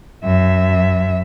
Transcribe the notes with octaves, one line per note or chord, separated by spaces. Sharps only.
F#2 E5